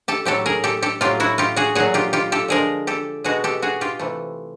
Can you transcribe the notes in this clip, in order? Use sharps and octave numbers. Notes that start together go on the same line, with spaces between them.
G4 A4
A2 F#3 A3 G4 A4
G#4 A#4
G4 A4
G4 A4
A2 F#3 A3 F4 G4
E4 F#4
F4 G4
F#4 G#4
A#2 F#3 A3 F#4 G#4
F4 G4
F4 G4
G4 A4
D3 F3 G#3 G#4 A#4
G4 A4
B2 G#3 F#4 G#4
G4 A4
F#4 G#4
F4 G4
C3 E3 A3